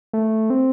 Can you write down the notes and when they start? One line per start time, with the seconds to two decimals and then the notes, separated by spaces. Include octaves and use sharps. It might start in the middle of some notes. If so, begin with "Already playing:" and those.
0.13 A3
0.50 C4